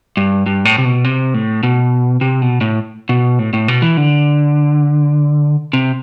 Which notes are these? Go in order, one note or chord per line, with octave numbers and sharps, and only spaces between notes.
G2
G2
A2
C3
B2
C3
A2
B2
C3
B2
A2
B2
A2
A2
B2
E3
D3
C3